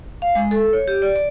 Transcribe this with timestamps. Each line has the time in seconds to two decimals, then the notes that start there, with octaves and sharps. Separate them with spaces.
0.22 F5
0.35 G#3
0.51 A4
0.73 C#5
0.88 G4
1.02 D5
1.16 D5